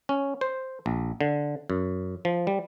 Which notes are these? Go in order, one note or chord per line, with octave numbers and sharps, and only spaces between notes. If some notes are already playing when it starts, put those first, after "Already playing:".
C#4
C5
A#1
D3
F#2
F3
G3